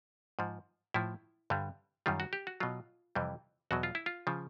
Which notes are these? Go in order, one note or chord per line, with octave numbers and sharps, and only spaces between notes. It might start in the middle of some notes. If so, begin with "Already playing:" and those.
G#2 F3
A2 F3 E4
G2 D3 G3
F#2 D#3 G3 F4
F#4
G4
F#4
B2 F#3 F4
F2 C3 E3 G3
E2 B2 F#3 F#4
F4
E4
F4
C#3 F3